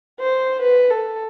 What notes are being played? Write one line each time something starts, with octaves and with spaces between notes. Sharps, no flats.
C5
B4
A4